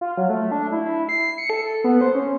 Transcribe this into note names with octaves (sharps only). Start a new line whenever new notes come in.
F4
F#3
A3
D4
E4
E4
C7
C#7
A4
B3
C5
C#4